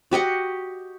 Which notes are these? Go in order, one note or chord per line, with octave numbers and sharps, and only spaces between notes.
F#4 G4 D#5 F#5